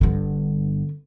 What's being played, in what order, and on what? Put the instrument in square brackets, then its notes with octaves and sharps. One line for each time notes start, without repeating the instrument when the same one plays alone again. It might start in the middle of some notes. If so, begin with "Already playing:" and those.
[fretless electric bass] G1 G2 [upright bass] D3 B3